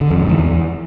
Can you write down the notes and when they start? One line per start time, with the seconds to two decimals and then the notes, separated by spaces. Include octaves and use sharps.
0.01 D3
0.10 F2
0.20 G#2
0.29 E3
0.39 E2